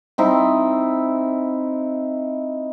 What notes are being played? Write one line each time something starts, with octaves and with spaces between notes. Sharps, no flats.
C4 D#4 E4